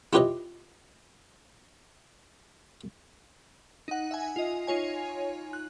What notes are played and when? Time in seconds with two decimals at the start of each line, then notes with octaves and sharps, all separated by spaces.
0.13 E4 F4 G4 B4 C#5 D#5
3.88 D#4 F#5
4.11 E5 F#5 G#5
4.36 F4 D#5
4.67 D#4 F4 C#5 G#5
5.53 F#6